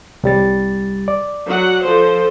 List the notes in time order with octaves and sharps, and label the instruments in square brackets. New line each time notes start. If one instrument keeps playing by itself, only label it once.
[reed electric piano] C2 G3 A6
D5
[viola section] F#3 F#5
F3 A4 C5